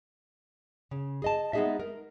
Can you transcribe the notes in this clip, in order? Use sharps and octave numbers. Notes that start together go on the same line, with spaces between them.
C#3
G#4 D#5 A5
G#3 B3 D#4 G#4 D#5 E5
A#4